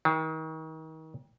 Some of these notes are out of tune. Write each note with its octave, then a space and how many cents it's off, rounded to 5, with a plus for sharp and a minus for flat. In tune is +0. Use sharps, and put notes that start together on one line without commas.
D#3 +35